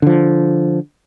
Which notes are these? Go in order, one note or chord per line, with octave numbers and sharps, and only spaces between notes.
D3 F3